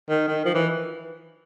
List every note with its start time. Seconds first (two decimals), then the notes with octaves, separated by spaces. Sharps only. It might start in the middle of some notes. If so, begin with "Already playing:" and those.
0.09 D#3
0.28 D#3
0.45 F3
0.54 E3